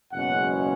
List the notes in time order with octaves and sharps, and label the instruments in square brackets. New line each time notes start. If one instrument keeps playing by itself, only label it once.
[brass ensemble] F#1 E2 B2 G#3 C#4 F#5